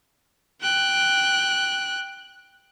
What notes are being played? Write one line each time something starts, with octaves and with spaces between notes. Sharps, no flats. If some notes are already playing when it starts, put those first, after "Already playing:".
G5 F#6